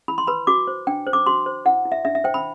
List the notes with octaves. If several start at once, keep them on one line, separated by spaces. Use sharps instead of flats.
E4 B5
C6
B4 B5
F#4 D6
C5
D4 G5
C5
D6
F#4 C6
C5
E4 F#5
E4
E5
D4 E5
E5
C5 G5
B5